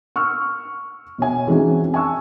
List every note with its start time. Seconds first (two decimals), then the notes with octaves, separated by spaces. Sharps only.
0.16 C#6 E6 F6
1.18 B2 C#5 G#5
1.47 E3 G#3 C4 C#4 D#4 F#4
1.94 G#5 A5 C#6 E6